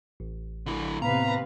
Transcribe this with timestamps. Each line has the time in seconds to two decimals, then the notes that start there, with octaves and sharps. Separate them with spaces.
0.20 A1
0.66 D3 E4
1.02 D#2 A2 C3 B3 B4 F5 A#5